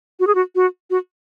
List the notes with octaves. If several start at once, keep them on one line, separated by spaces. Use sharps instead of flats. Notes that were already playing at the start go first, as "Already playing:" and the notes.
F#4
G#4
F#4
F#4
F#4